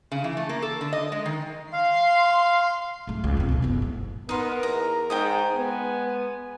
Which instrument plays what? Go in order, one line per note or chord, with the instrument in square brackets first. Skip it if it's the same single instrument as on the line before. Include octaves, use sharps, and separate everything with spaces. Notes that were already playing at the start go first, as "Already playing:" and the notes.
[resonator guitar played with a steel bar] C#3
E3
A3
A#3
A4
D3
D#5
G#3
D#3
[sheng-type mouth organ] F5 [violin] C6 C7
[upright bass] G#2 A3
C#2
F1 C3
B1 G#3
F#1 B3
A2
[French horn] B3 [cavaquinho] D#4 C6 [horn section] A#4
[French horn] E2 [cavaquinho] A#5
[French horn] G#2 [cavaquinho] G5 A#5 D#6
[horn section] G#3 G#5 [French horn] B3